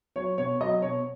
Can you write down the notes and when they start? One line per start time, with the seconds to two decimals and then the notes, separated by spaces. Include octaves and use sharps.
0.16 F#3 C#5
0.38 B2 C#5
0.61 F#3 D#5
0.82 B2 C#5